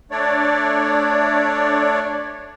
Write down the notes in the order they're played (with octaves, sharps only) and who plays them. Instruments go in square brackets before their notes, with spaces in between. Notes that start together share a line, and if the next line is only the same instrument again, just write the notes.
[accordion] A3 D4 C#5 D5